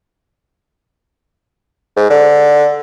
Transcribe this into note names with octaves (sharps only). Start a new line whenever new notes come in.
G#2
D3